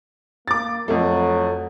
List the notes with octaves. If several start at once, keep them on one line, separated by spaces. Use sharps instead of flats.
A#3 D6 A6
F2 F#3 A3